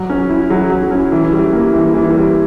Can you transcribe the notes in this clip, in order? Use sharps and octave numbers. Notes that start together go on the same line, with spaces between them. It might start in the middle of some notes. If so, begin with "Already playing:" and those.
Already playing: F#3
C#4
E4
F#3
F#3
C#4
E3
G3
A#3
E3
E3
G3